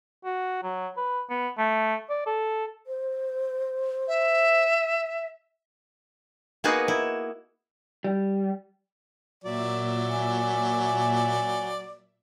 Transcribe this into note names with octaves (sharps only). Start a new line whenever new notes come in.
F#4
F#3
B4
B3
A3
D5
A4
C5
E5
A#3 B3 D#4 F#4 G#4 B4
E4
G3
A#2 F#3 D5 E5
G#5